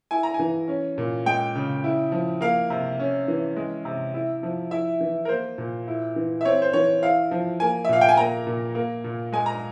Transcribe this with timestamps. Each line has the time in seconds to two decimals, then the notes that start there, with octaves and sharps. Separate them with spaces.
0.11 E4 G#5
0.23 A#5
0.34 G#5
0.39 E3
0.68 C#4
0.98 A#2
1.26 G#3 G5
1.55 C#3
1.84 E4
2.12 F3
2.41 A#3 F5
2.70 C3
2.99 C#4
3.28 E3
3.56 G#3
3.85 C3
4.14 E4
4.43 F3
4.71 E4 E5
5.01 E3
5.25 A#4
5.29 A#3 C5
5.58 A#2
5.88 E4
6.16 E3
6.41 E5
6.45 C4 C#5
6.62 C5
6.73 E3 C#5
7.03 E4 F5
7.31 F3
7.60 A#3 G#5
7.85 E5
7.89 A#2 F5
8.01 G5
8.09 G#5
8.17 A#3 A#5
8.47 A#2
8.75 A#3
9.04 A#2
9.32 G#3 G#5
9.46 A#5